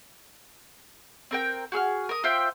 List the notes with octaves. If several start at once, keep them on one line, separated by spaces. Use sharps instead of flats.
C4 A#4 G5
F#4 G#4 E6 F6
A#4 D#6
F4 C5 E5 G5